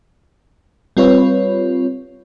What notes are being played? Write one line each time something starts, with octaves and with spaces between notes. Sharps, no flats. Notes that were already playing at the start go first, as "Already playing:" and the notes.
G3 C4 F4 B4 C#5